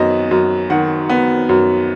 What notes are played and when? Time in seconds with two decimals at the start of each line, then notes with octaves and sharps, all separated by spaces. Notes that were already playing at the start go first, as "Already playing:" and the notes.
Already playing: F#2 D#3 B3 D#5
0.31 F#2
0.70 D#3 F#5
1.09 B3
1.49 F#2